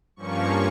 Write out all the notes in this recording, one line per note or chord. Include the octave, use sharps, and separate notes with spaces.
G2 F3 A#3 C#4 C#6